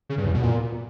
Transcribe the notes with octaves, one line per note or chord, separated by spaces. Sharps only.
C#3
G2
E2
B2
A#2